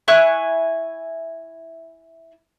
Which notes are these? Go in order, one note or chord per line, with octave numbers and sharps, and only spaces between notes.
E4 G#5 C#6 F#6